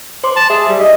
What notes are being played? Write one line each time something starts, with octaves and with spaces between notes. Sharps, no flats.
C5 C6 D6
A5
G#4 E5
G3
D#5